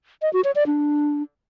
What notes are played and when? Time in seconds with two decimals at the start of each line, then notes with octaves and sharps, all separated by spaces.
0.22 D#5
0.33 F#4
0.44 C#5
0.56 D5
0.67 D4